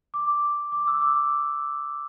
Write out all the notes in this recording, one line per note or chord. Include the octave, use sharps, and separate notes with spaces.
D6
D6
E6
D6